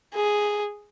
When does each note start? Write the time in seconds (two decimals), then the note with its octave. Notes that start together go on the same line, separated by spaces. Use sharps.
0.14 G#4